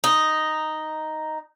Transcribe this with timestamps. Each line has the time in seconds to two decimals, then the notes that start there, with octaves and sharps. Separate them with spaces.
0.04 D#4